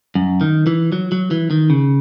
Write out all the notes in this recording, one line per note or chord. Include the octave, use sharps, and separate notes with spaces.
F#2
D#3
E3
F#3
F#3
E3
D#3
C#3